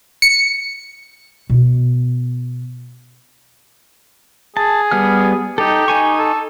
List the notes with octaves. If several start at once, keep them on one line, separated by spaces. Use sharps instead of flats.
C#7
B2 B3
G#4 A5
G3 B3 F6
D#4 G4 A4
D#4 G#5 C#6
A4